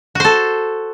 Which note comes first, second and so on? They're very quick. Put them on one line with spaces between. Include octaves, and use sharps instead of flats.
F#4 C5 A4